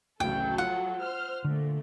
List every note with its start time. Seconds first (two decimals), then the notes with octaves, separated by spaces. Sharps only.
0.20 D1 A1 C#3 F#3 A4 G5
0.58 F4 F#5
1.01 C5 F6
1.44 A#2 D3 A3